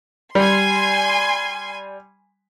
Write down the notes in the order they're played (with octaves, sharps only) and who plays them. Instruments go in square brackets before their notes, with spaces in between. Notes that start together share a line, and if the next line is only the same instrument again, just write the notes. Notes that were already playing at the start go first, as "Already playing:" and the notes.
[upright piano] G3 [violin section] G#5 C6